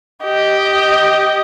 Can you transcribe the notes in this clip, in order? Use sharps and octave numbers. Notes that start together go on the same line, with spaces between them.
G4 D#5